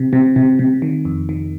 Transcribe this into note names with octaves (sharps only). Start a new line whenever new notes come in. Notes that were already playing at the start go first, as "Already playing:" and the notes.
Already playing: C3
C3
C3
C3
D#3
F2
D#3